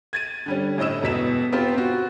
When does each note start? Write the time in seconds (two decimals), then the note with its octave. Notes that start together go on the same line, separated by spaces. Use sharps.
0.13 G#6 A6 D#7
0.46 D3 G3 C#4
0.78 A2 C#4 E4 D#5 E6 E7
1.02 E1 B2 B6 E7
1.52 B3 C4 F4 G4
1.74 C4 F#4